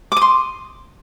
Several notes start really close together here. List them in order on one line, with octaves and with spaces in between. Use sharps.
D6 D#6 C6